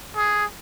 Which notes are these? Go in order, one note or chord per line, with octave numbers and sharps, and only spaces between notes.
G#4